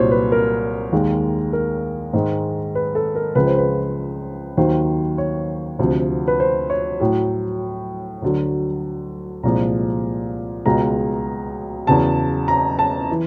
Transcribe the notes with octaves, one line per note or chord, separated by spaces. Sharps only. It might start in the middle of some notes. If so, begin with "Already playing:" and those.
Already playing: C2 A#2 F#3 C5 C#5
B4
A#4
D#2 D#3 G#3
A#4
G#2 D#3 G#3
B4
A4
A#4
C#2 C#3 F3 G#3 B4
C5
B4
D#2 D#3 F#3 C5
C#5
D2 C3 F3
B4
C5
C#5
A2 F#3
D2 D3 F#3
C2 A#2 F3 G#3 A#5
C#2 B2 G#3 A#5
E2 C#3 F#3 A5
A#5
A5
E3